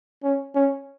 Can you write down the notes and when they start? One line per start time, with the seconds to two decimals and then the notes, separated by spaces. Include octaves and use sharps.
0.24 C#4
0.55 C#4